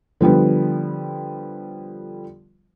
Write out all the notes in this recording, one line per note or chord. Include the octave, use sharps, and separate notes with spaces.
D3 F3 G3 B3